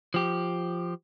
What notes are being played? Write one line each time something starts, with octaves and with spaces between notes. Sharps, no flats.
F3 G4